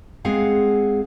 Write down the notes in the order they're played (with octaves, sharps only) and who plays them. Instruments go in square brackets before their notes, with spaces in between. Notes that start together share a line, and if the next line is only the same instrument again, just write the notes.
[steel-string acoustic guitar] G#3 C4 G#4 F5 F#5